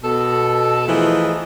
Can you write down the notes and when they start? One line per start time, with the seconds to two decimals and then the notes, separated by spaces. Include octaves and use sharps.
0.04 B2 A4
0.87 E3 F3 A3 D#4 G#4 C5